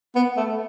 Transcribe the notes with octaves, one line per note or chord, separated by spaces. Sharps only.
B3
A3